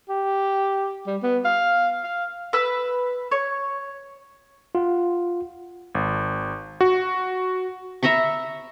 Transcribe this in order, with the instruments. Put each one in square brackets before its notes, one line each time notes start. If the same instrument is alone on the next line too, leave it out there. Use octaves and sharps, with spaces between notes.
[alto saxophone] G4
G3
B3
F5
F5
[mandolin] B4 E6
C#5
[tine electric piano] F4 F#5
[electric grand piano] G#1
F#4
[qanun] E5 A#5 B5 C#6